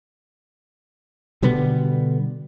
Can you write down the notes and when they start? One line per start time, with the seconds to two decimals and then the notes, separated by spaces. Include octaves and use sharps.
1.42 B2 D3 G3 B3